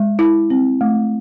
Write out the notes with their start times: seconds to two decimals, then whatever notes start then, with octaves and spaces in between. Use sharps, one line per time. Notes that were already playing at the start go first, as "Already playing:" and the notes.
Already playing: G#3
0.19 E4
0.50 C4
0.81 A3